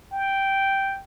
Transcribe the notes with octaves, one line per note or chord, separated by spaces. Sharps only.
G5